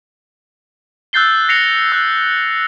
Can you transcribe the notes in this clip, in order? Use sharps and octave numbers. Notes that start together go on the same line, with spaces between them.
E6 F#6 G6 A6 C7 G7
A#6 C7 C#7 F7
E6 F#6